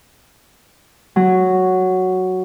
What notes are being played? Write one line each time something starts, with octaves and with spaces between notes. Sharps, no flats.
F#3